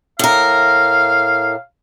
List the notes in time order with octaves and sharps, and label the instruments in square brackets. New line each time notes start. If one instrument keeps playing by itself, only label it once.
[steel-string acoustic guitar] A2 A#4 [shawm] F5